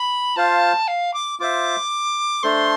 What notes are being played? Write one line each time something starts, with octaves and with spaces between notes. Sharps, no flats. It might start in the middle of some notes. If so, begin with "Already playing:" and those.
Already playing: B5
F4 C5 F5 A5
F5
D6
F4 C5 E5 D6
A3 D4 A4 C5 C6